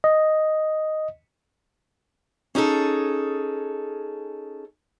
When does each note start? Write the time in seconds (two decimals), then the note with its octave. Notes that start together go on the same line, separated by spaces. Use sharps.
0.04 D#5
2.55 C#4 D#4 G#4 A4